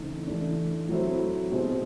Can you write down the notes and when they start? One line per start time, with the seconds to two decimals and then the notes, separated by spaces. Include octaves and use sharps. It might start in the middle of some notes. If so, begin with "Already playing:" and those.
Already playing: C#3 E3 A3 C4 D#4
0.27 E3 A3 D4
0.89 F#3 A3 C4 E4
1.52 B2 G#3 C4